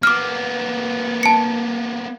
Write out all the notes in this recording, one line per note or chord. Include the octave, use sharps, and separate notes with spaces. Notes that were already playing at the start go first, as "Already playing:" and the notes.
A#3 B3 D6 F6
A5 C#7